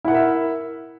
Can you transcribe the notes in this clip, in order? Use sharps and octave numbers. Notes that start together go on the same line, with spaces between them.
E4 A#4 E5 F#5